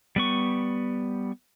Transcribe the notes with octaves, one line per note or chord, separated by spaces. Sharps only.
G3 B3 C#6